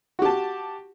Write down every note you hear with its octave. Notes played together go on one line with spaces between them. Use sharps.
F#4 G4 A5